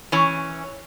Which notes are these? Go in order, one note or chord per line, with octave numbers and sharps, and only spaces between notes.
E3 C#4